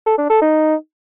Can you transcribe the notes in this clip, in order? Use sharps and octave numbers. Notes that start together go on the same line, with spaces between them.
A4
D4
A4
D#4